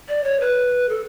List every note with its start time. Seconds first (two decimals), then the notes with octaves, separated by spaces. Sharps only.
0.09 D5
0.24 C#5
0.40 B4
0.89 A4